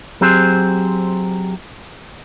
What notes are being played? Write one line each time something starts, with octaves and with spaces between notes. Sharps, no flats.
F#3 C4 G4 G#4 C5